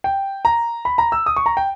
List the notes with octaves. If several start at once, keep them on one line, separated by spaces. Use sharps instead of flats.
G5
A#5
B5
A#5
E6
D#6
C#6
A#5
G5